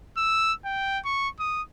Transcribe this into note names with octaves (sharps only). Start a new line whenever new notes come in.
E6
G5
C#6
D#6